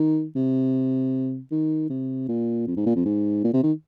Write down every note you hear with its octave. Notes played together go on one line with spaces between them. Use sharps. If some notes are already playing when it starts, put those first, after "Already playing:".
Already playing: D#3
C3
D#3
C3
A#2
F2
G#2
A#2
F2
G#2
A#2
C3
D#3